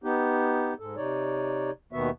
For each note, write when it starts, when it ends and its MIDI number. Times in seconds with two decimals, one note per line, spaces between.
0.04 0.74 59
0.04 0.74 63
0.04 0.74 67
0.79 0.96 44
0.79 0.96 69
0.97 1.71 48
0.97 1.71 63
0.97 1.71 73
0.97 1.71 74
1.93 2.10 39
1.93 2.10 47
1.93 2.10 51
1.93 2.10 59
1.93 2.10 66
1.93 2.10 76